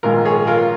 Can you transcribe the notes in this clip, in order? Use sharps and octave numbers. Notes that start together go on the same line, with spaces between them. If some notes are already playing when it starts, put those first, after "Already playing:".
A#1 G#2 D#3 F4 A#4
G#4 C#5
F4 A#4